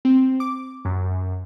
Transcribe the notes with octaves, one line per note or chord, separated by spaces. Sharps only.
C4
D6
F#2